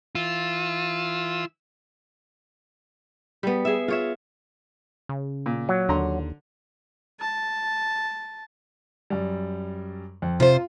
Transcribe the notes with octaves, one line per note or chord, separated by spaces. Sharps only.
E3 F4 E6
G3 B3
G#4 E5
F4 C#5 E5
C#3
A#2
F#3
D#2 D3 A#5 C6
A5
F#2 G3
F2
C3 F4 C5